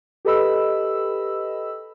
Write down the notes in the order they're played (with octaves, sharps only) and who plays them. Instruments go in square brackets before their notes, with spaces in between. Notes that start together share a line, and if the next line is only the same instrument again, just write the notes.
[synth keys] G4 A4 B4 D#5 B5 E6